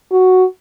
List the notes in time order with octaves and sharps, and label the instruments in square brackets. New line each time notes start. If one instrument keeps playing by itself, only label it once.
[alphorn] F#4